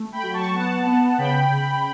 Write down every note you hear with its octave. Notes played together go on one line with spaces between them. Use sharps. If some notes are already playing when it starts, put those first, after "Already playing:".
Already playing: A3
G5 B5
F#3
A5 C#6
B3 F#5 A5
B3
C#3 G5 B5
C#3